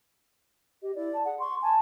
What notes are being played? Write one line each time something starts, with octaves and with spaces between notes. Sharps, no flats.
G4 D#5
E4 D5
A5
G#4 F#5
C6 C#6
G#5 A5